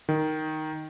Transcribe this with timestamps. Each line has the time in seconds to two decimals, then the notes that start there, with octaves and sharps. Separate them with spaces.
0.09 D#3